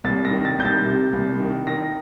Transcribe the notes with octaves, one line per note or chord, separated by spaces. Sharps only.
C2 A6
A#6
D#3
A6
C2 G6
A6
C3
C2
D#3
D#3 A#6